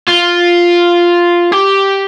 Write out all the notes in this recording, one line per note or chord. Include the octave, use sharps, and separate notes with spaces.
F4
G4